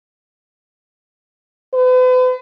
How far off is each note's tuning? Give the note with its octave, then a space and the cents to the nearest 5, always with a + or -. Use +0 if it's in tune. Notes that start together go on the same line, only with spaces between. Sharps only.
B4 +45